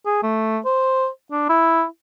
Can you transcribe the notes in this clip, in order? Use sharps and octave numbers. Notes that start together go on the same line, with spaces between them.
G#4
A3
C5
D4
E4